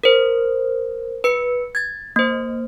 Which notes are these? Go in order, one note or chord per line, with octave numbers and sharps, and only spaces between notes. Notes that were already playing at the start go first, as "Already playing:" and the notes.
A#4 C5
B4 C#7
G#6 A6
A#3 C5